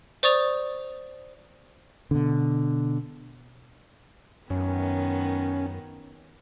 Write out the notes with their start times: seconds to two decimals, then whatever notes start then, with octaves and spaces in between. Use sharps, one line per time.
0.23 C5 D5 C#6 D#6 A6 F7
2.11 B2 D3
4.50 F#2 D#3 B3 C#4